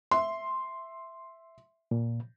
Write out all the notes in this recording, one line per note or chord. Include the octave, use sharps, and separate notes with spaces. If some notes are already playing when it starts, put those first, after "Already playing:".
E5 C6
A#2